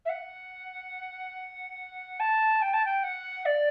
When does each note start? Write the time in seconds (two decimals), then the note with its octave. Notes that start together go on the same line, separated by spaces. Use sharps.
0.05 E5
0.09 F#5
2.20 A5
2.62 G5
2.73 A5
2.85 G5
3.03 F#5
3.45 D5